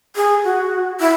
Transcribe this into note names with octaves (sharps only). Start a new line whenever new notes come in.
G#4
F#4
E4